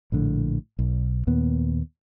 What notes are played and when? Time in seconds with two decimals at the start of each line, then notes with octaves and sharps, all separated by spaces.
0.12 A#1 A2 D3
0.79 B1
1.27 D#2 A#2 B3